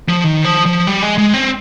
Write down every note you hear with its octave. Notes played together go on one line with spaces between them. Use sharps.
F3
D#3
F3
F3
G3
G#3
G#3
C4